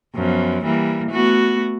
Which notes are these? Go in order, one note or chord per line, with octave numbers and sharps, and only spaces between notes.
F#2 F3 B3
E3 G3 A#3
A3 B3 F#4